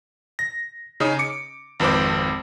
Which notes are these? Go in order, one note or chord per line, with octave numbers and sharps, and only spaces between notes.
A#6
C#3 C#4 D#4 D#6
D6 C#7
G#1 F2 B4 C5 D6